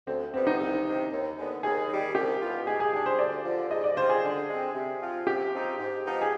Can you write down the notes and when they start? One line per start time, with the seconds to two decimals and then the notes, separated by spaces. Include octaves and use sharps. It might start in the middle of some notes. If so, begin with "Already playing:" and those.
0.07 D2 C4
0.34 C3 G3 B3 C4 F4
0.47 D#4
0.59 C2
0.85 C3 D#3
1.12 D#2
1.38 D3 G#3 B3
1.63 D#2 G#4
1.89 D#3 G3
2.15 C2 G4
2.41 B2 B3 F4
2.66 G#2 G#4
2.80 G#4
2.93 G3 D4 G#4
3.06 C5
3.19 D2 D5
3.45 D3 F3
3.70 G#2 D#5
3.84 D5
3.96 G3 D4 F4 C5
4.09 G#4
4.22 D3
4.49 G#3 C4
4.74 C3
5.00 F3 C4 F4
5.26 C3 G4
5.52 F3 C4 D#4
5.78 G#2
6.04 F3 B3 D#4
6.21 G#4